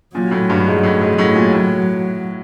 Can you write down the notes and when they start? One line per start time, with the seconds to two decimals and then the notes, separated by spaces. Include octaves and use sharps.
0.15 A#2 F#3
0.31 A2
0.50 G2
0.67 G#2
0.83 A2 F#3
1.01 G#2
1.18 A2 F#3
1.35 A#2
1.53 A2